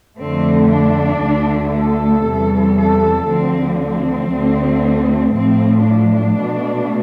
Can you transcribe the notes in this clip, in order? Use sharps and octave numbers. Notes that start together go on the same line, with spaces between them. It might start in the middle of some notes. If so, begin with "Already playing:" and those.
F2 D3 A3 C4
D4
D2 D3 A3
A4
E2 C3 E3 G3
A4
D2 D3 F3 C4
C4
D2 D3 A3
A2 F3 A3 C4
D4
B2 A3